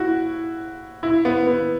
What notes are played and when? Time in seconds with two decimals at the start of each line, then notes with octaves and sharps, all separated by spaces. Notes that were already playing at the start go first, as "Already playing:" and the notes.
Already playing: E4 F#4
1.03 E4
1.25 B3
1.47 B3